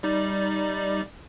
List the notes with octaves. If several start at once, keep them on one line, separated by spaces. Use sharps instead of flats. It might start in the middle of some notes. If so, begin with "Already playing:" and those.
G3 D#4 D5